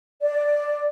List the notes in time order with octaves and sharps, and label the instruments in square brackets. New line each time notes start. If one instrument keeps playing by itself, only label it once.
[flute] D5